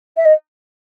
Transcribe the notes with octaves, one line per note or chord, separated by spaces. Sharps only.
E5
D#5